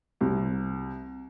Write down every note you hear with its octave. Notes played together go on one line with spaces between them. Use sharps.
C2